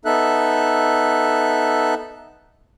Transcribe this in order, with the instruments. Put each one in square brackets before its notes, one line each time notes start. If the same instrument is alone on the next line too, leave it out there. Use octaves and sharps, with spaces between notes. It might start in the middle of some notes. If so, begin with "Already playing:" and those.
[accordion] B3 D#4 A4 E5 F#6